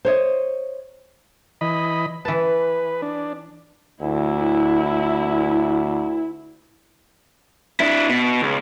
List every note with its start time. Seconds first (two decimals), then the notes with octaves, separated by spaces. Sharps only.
0.05 C5 C#5 D#5
1.61 E3 D#5 B5
2.25 E3 B4 A5
3.02 D4
4.02 D2 E4
7.80 D4 E4
8.09 B2
8.42 C#2